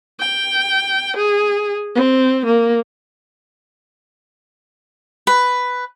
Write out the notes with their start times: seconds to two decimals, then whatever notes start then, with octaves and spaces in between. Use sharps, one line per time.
0.20 G5
1.17 G#4
1.95 C4
2.46 A#3
5.27 B4